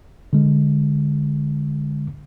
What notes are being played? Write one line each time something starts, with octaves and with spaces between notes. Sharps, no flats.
D3 G#3